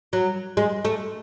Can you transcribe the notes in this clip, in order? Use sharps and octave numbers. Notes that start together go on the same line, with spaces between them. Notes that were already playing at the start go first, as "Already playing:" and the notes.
F#3
G#3
A3